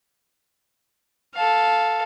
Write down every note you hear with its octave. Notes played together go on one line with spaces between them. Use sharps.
A4 F5